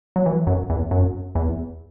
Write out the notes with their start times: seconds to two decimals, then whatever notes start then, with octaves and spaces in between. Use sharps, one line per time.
0.16 F#3
0.26 E3
0.47 F#2
0.70 E2
0.91 F#2
1.35 E2